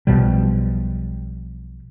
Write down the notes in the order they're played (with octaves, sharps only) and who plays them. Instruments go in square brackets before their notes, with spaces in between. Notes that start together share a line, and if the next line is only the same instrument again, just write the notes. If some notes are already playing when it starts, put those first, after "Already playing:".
[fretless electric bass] B1 B2 F3 G3